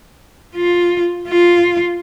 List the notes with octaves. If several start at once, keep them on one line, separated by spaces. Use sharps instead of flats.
F4
F4